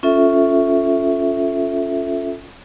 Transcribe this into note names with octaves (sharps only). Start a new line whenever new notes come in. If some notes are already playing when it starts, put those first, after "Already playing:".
C#4 F4 A4 E5